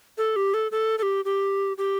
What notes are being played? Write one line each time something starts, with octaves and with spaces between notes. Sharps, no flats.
A4
G4
A4
A4
A4
G4
G4
G4